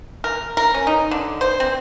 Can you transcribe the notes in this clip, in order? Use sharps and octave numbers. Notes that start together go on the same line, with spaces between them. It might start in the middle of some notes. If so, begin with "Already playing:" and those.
A#4
A#4
C#4
D#4
D3
C5
C4